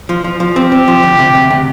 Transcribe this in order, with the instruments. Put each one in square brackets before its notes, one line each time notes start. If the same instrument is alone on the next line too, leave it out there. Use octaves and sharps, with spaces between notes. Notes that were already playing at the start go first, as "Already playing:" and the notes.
[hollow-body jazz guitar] F3
F3
F3
[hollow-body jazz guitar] C4 [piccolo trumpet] G4
[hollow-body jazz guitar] C4
F3
D2
C3
D2
C3